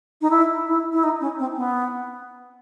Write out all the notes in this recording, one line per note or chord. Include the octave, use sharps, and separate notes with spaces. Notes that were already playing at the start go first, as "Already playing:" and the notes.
D#4
E4
E4
E4
D#4
C#4
C4
B3